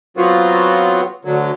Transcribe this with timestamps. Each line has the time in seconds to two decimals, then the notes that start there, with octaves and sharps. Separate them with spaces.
0.17 F#3 B3 C4 F4 F#4
1.25 D2 D3 F#3